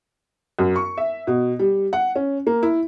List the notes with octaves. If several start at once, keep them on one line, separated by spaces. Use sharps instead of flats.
F#2
C#6
E5
B2
G3
F#5
C#4
A#3
E4